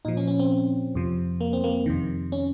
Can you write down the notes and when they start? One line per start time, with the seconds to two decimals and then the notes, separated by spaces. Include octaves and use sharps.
0.05 A#2 F3 D#4
0.17 C#4
0.28 C#4
0.39 C4
0.95 F2 C3 F3
1.41 A#3
1.53 C4
1.64 A#3
1.86 F2 C3 D#3
2.32 C#4